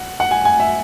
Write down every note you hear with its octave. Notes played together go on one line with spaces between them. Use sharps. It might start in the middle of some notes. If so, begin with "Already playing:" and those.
Already playing: F#5
F#5
G#5
G#5
E5